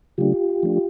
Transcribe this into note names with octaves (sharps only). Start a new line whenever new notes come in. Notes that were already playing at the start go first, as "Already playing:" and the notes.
C#3 F#3 A3 D4 F4 G4
F3 A3 D4